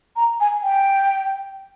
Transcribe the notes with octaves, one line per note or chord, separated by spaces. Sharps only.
A#5
G#5
G5